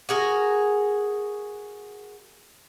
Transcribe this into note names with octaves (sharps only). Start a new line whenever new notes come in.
F#4 G#4 A#4